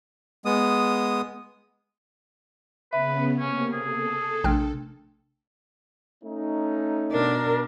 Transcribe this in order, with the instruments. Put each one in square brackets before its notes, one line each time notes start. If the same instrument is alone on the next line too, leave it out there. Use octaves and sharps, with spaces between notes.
[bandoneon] G#3 B3 D#6
[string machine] C#3 B3 [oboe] B4 [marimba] E5
[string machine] C3 A#3 [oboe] C#4
[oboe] G#4 [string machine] A4
[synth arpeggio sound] A#1 G5 F6 [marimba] C3 A3 D4
[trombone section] A3 C#4 D#4
[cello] B2 D4 [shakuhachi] A#4